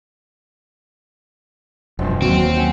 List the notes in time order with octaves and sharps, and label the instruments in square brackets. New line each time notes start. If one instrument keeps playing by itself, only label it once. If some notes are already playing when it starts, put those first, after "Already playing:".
[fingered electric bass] E1 [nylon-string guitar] F#2 F3
[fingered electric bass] D#2 [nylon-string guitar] F#3 B3 F#4 [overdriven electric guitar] C4
[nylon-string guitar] F#3 C#4 F#5